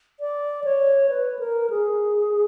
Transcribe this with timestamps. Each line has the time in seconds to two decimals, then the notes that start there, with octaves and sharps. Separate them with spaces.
0.20 D5
0.64 C#5
1.09 B4
1.39 A#4
1.70 G#4